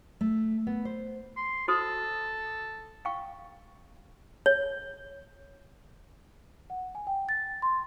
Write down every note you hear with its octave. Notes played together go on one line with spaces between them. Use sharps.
A3
B3
C5
C6
F#4 A4 C5 D#6
F5 G5 C#6
C#5
F#5
G#5
G5
A6
C6